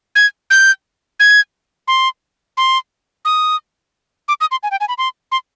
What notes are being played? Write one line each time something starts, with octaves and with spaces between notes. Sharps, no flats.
G#6
G6
G#6
C6
C6
D#6
D6
D#6
C6
G#5
G5
G#5
B5
C6
C6